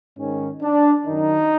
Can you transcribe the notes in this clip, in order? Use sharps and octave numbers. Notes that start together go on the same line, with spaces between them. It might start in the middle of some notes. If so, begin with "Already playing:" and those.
G#2 D#3 C#4
D4
F#2 D#3 D#4